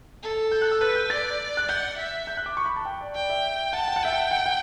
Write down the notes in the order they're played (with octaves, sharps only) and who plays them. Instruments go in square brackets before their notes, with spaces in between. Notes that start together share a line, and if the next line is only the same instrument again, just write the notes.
[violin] A4
[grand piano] G6
F#6
E6
[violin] B4 [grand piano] F#6
[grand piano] G6
[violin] D5 [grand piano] A6
[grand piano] F#6
[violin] F#5 [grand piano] G6
[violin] E5
[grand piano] G6
F#6
D6
C#6
B5
A5
G5
D5
[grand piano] D5 [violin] G5
[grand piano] E5
[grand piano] F#5 [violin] A5
[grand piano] G5
F#5
[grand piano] E5 [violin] G5
[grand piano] F#5
F#5
F#5